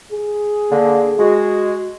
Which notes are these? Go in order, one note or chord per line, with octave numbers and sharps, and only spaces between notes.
G#4
D3 A#3
G#3 F#4